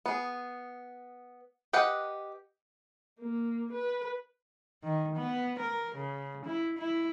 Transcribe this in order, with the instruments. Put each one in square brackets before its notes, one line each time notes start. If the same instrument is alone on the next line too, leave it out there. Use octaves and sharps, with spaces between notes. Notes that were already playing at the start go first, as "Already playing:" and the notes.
[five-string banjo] B3 G#4
G4 B4 D#5 F#5
[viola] A#3
B4
[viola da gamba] D#3
B3
A#4
C#3
E4
E4